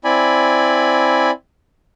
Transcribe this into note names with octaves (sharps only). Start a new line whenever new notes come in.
C4 E4 D5 G#5 B5